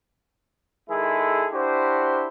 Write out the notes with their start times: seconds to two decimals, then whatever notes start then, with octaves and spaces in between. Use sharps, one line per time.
0.90 D#3 G#3 E4 G#4 A4
1.53 D4 E4 F#4 G4 C5